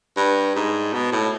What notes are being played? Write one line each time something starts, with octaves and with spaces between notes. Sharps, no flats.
G2
G#2
B2
A2